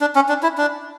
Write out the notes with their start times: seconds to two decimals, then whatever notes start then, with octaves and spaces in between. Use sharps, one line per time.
0.01 D4
0.15 C#4
0.29 D4
0.43 E4
0.58 D4